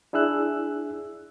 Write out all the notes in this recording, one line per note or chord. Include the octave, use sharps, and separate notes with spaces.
D4 E4 G#4 E6 F#6